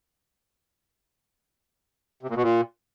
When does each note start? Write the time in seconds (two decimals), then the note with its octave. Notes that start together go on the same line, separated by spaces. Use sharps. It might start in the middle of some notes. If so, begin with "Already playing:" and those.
2.23 C3
2.29 A#2
2.36 B2
2.43 A#2